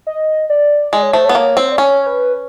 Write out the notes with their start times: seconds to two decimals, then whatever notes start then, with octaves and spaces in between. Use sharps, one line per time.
0.07 D#5
0.50 D5
0.92 G#3 D5
1.03 C#5
1.13 A3 C5
1.25 B3 C#5
1.35 A#3
1.57 C4
1.72 D5
1.78 C#4 C#5
2.06 B4